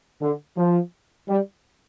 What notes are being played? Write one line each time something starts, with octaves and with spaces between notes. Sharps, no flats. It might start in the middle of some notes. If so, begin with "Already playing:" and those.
D3
F3
G3